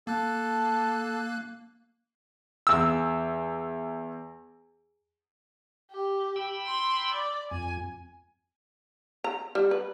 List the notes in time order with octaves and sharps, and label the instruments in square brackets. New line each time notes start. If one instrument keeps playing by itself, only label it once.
[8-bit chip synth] A#3 F#6 [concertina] A4 A5
[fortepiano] E2 E6
[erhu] G4
[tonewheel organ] G5 B5 E6
[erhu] C6
D5
[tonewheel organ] F2 [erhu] G#5
[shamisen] A#5
G3
B4